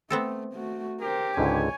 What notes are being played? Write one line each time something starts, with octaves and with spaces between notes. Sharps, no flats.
A3 B3 C4 A4
A3 F#4
G4 A#4 C5
C#2 G#2 D3 C#5 G#5